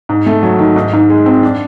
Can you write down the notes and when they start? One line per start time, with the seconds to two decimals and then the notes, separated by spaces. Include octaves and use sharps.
0.09 G#2
0.26 A3
0.43 F#3
0.59 D#3
0.76 G#2
0.93 G#2
1.10 G#3
1.26 C4
1.43 D4